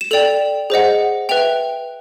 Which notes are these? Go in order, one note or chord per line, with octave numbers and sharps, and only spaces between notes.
E7
A4 D5 G5 F7
G#4 C5 D#5 F#5
B4 E5 G5 F7